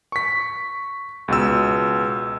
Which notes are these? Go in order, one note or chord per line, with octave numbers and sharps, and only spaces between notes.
C#6 B6
C#2 B2 E6